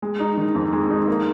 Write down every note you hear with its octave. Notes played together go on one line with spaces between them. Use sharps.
G#3
D#4
D#3
F2
G#3
D#4
A#3